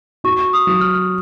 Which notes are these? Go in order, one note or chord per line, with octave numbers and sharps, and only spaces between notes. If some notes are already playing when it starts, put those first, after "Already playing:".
F#4 C#6
D#6
F#3
F6